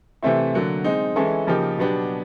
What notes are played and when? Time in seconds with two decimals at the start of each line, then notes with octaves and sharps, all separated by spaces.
0.22 C3 E3 A3 C4 E4
0.54 D3 F#3 A#3
0.84 G#3 C4 D#4
1.16 E3 G#3 C#4 E4 A4
1.47 C#3 F3 A#3 D#4 G4
1.78 B2 F#3 B3 D4 G4